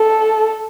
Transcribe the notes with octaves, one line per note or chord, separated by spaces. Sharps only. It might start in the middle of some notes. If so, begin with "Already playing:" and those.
Already playing: A4